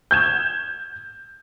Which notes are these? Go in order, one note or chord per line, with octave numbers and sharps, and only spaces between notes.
G6 G#6 E7